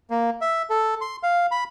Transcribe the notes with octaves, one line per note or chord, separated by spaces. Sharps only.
A#3
E5
A4
C6
F5
B5